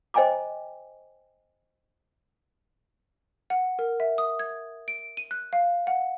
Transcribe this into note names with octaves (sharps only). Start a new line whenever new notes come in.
C5 D#5 G5 G#5 A#5 D6
F#5
A#4
E5
D#6
G#6
D7
D#7
F#6
F5
F#5